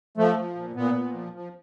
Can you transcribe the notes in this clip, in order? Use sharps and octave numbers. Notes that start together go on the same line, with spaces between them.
F3 A3
F3
A#2
A#2 B3
A#2
F3
F3